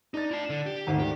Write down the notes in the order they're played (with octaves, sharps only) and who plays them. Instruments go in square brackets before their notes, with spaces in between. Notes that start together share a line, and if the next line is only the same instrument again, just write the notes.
[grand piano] D4 A6 [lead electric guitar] D#4
[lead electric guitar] E4 A5
D3
G4
[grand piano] G#1 D2
[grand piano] D#3 D4 [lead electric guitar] G4